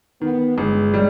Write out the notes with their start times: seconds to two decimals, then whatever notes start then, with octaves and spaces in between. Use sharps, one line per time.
0.21 D#3 B3
0.57 G1 G#3
0.94 G3